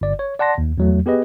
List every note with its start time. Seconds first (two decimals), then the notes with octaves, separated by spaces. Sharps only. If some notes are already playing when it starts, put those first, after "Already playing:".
0.01 G1 D5
0.19 C#5
0.39 D5 F#5 A5 C6 A#6
0.58 D#2
0.78 E2 F#3 A3
1.06 B3 G4 G#4 B4 D#5